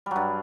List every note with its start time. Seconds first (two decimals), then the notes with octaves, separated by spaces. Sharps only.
0.06 G3
0.11 F#3
0.16 G2